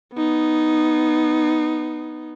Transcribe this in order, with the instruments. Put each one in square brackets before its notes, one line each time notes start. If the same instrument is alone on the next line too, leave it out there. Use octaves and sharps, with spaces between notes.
[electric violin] B3 D#4